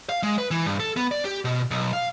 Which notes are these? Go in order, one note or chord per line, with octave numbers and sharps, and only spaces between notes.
F5
G#3
B4
E3
G2
A4
B3
D5
G4
B2
B1
F5